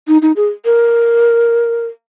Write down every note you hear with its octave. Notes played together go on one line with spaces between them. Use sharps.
D#4
D#4
G#4
A#4